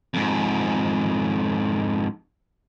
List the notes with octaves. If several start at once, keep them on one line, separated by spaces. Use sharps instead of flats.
F2 G#2